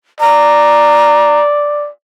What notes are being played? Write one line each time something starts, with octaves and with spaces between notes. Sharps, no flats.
D5 A#5